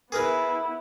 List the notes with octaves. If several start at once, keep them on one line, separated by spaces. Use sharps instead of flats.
B3 E4 G#4 A#4 B4